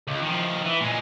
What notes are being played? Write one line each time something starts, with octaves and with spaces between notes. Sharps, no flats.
C#2
D#3 F3
E3
A#2 G#3